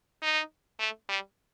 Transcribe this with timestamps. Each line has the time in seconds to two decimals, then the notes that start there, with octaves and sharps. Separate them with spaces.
0.22 D#4
0.79 A3
1.09 G3